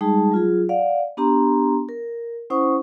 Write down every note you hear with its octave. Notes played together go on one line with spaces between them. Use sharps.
G3 G#3 D#4 G#4 A5
F#3 F4 G#4
D5 F5 F#5
B3 D4 G4 A#5 C6
A#4
C#4 E4 C5 F#5 C#6 D#6